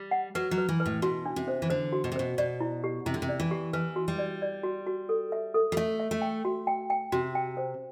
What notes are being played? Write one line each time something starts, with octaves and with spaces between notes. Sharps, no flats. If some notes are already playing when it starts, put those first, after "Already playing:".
Already playing: G3
F#5
F#3 B4
F#3
B4
E3
B4
A2
B2 F#4
D4
C3
C5
E3
D3 C5
F#4
B2
C3
B2 C5
B2 D5
E4
G4
C3 E4
D3
C3
D5
E3
G4
E3 B4
F#4
G3
D5
D5
F#4
F#4
A4
E5
A4
G3
A3 E5
E5
A3
G5
F#4
G5
G5
C3 F#4
G5
C5